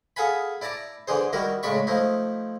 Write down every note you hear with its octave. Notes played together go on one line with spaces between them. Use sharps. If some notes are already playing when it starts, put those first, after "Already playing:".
G#4 A4 F5 F#5 G#5 B5
E4 D5 A5 A#5 D6
D3 E3 D4 G#4 C5
D#3 G3 E4 F#4 A#4
A2 C#3 G#3 D5 B5 C#6
F3 A3 D#4 E4